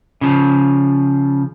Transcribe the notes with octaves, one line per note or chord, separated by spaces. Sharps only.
C#3 F3